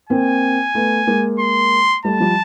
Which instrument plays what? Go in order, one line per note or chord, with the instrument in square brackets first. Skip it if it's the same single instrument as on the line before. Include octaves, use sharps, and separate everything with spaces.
[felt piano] A#3 C4 [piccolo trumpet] G#5
[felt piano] A3 B3
G#3 A#3
[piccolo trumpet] C6
[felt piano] G3 A3 [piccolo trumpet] A5
[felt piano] F3 G3